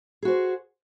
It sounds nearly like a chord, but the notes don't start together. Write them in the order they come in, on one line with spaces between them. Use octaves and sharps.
G#4 F#4 C5